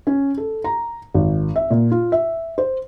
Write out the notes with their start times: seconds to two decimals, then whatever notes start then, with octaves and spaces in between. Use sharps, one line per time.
0.07 C#4
0.38 A4
0.64 A#5
1.14 G#1
1.56 E5
1.70 A#2
1.91 F4
2.12 E5
2.58 C5